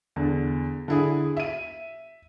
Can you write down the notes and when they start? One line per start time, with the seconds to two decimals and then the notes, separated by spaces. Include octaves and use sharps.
0.16 E2 D3
0.88 D3 E4 G#4
1.37 E5 D#7